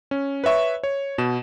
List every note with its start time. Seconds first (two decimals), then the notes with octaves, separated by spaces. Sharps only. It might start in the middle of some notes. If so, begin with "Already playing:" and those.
0.11 C#4
0.44 B4 C#5 E5 C#6
0.83 C#5
1.18 B2 E7